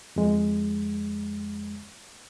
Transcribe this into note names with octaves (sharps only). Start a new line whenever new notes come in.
F2 G#3